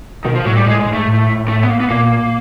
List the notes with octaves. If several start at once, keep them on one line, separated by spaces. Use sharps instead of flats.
B2 D#3
F3
A2 F#3
G3
A2 G#3
G#3
G#2
A3
A2
A3
B3
A#3
B3
A#2 A#3